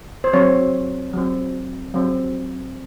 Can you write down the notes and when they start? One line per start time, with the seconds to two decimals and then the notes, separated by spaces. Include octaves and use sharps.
0.24 C5
0.33 F#3 C4 C#5
1.13 F#3 C4
1.94 F#3 C4